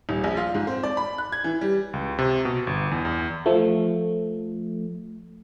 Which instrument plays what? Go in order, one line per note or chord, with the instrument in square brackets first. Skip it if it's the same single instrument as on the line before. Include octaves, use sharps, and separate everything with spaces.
[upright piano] D#1
A#1
F4
G#2
C4
D5
B5
F#6
G#6
E3
G3
[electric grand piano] C#2
C3
B2
G1
E2
E2
[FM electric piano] F3 A3